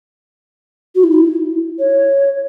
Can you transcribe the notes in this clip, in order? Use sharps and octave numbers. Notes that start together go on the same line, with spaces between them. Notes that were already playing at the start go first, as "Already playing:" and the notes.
F#4
E4
D#4
E4
C#5